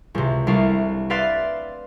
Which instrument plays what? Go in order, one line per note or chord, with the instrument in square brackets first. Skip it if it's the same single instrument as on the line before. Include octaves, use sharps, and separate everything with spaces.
[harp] C#2 C3
C2 A3 D4 F5
B4 D5 E5 F5 C6 A6